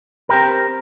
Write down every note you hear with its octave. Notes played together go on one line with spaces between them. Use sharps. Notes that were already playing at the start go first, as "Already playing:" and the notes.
C4 G4 A#4